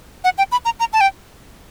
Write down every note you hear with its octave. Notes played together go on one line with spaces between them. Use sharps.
F#5
G5
B5
A#5
A#5
A5
G5